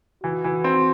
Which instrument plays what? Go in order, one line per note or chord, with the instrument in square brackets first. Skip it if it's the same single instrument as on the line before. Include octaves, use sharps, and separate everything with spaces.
[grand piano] E3 [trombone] F#4
[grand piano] E3
C4